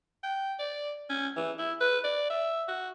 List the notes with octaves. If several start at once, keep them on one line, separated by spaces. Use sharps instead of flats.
G5
D5
C#4
E3
E4
B4
D5
E5
F#4